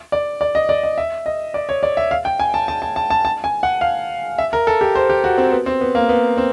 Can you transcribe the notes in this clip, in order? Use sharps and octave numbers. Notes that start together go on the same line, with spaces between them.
D5
D5
D#5
D5
D#5
E5
D#5
D5
C#5
D5
E5
F5
G5
G#5
A5
A5
A5
A5
A5
A5
G#5
F#5
F5
E5
A#4
A4
G4
C5
G4
F#4
C4
B3
C4
B3
A#3
B3
C4